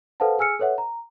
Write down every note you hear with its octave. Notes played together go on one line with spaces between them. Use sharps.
A4 B4 C5 F5 F#5 A5
G#4 G#5 E6 F6 C#7
A4 B4 C#5 E5 F#5
A#5